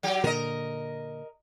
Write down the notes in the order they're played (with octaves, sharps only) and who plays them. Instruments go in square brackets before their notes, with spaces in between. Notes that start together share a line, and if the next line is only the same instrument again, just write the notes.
[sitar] F#3 G4
[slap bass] A#2 D3 [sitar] A#4 D#5